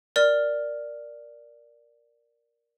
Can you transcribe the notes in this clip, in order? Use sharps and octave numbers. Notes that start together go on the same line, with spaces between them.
A#4 D5 F6